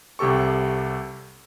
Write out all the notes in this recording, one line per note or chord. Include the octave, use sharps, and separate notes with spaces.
C2 C3 G4 A4 C#6